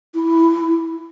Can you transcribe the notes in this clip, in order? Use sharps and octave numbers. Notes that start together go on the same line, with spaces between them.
E4